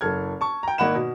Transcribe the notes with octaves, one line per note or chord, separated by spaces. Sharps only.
F#1 A4 F6 G#6
A5 C#6
G5 A#5
G#1 A#3 D#5 F#5 B5 E7
B2